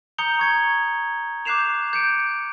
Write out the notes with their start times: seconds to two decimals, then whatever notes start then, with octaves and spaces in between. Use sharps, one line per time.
0.18 A#5 D#6 G6 C#7 F7 G7
0.39 C#6 G#6 C#7
1.45 D6 F#6 G6 C7 E7 F7
1.93 G6 C#7 D7